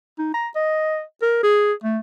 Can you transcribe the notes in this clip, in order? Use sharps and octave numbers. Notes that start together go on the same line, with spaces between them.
D#4
A#5
D#5
A#4
G#4
A3